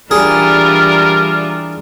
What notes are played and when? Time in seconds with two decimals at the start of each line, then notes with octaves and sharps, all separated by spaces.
0.11 E3 G3 D4 F4 G#4 A#4